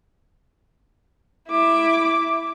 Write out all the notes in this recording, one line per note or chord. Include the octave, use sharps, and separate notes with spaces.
E4 D6